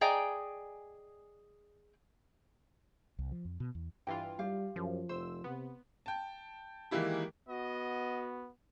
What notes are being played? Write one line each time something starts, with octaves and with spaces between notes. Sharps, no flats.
G#4 D5 D#5 G5 G#5 A#5
C2
F3
F2
B2
E2
G2 E3 F4 G5
G3 G4 F5
F#2 F3
F1 C5 E6
C3 B3
G5 A5
D#3 E3 G#3 A#3 E4 G4
B3 F#4 D#5